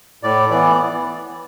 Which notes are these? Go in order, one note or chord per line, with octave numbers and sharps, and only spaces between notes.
A2 D5
E3 B3 D5